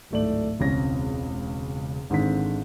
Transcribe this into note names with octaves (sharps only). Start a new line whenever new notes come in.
D1 G#1 A3 D5 F#7
E1 C#2 C4 C#4 A#6
G#1 G#2 D3 D#3 C4 B6